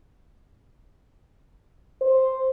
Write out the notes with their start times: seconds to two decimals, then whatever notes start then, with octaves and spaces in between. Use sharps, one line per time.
2.01 C5